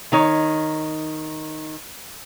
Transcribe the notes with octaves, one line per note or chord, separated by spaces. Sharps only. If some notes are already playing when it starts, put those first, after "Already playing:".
D#3 D#4 C#5